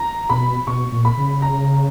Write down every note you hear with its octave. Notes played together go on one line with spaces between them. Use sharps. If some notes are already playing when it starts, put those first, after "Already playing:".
Already playing: A#5
B2 B5
B2 C#6
A#2
B5
C#3
A#5